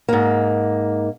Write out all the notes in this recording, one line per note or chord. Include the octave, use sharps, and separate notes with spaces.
G#2 A#3